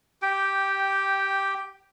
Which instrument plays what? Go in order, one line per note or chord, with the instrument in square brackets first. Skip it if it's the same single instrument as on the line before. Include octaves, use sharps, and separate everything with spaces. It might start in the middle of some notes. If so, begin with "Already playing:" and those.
[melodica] G4 G5